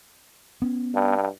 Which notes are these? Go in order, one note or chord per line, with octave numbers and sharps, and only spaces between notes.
B3 C#4
G2